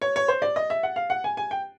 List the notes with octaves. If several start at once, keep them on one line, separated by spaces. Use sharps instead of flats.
C#5
C#5
C5
D5
D#5
E5
F#5
F5
F#5
G#5
G#5
G5